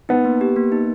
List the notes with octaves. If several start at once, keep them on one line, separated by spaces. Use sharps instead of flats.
B3 D#4
A#3
G4
A#3
D#4